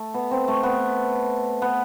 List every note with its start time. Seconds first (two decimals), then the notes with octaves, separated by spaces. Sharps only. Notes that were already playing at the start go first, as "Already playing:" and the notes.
Already playing: A3
0.14 B3
0.31 C4
0.48 A3
0.63 B3
1.62 B3